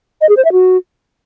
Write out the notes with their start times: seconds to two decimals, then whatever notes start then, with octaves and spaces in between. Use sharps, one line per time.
0.21 D#5
0.29 G#4
0.37 C5
0.45 E5
0.52 F#4